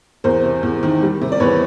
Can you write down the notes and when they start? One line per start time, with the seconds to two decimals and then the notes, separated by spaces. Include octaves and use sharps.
0.24 E2 A#4 C5
0.44 C3
0.63 E2
0.83 D#3
1.02 G3
1.21 C3
1.32 D5
1.40 E2 B4 C#5